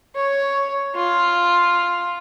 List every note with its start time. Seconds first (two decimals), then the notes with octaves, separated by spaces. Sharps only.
0.15 C#5
0.95 F4